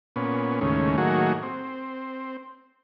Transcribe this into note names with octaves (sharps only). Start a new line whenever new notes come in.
A#2 B3 C#4
D#2 A2 C#3 G#3 C#4
A2 D#3 F#3 A#3 F#4 G#4
C4